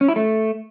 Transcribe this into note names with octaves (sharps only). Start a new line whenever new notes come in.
C#4
E4
A3